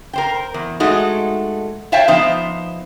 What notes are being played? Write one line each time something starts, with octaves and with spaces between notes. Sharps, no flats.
A#4 C5 G5
E2
G#3 A3 D#4 F#4
C5 C#5 E5 F5 G5 A5
F3 B3 D#4 C5 E5